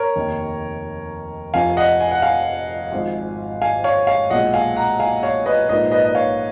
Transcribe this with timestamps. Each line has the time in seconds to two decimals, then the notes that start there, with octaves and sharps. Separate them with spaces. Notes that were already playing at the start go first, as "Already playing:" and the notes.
Already playing: A#4 C#5
0.16 F1 D#2 D#3
1.54 F1 F2 F3 F5 G#5
1.77 D#5 F#5
2.00 G#5
2.11 F#5
2.22 F5 G#5
2.92 G#1 G#2 F3
3.62 F5 G#5
3.84 C#5 F5
4.07 C#5 F5
4.30 B1 A#2 G#3 D#5 F#5
4.54 F5 G#5
4.76 F#5 A#5
5.00 F5 G#5
5.23 C#5 F5
5.46 B4 D#5
5.69 A#1 G#2 F3 A#3 D#4 B4 D#5
5.91 B4 D#5
6.05 D#5
6.15 C#5 F5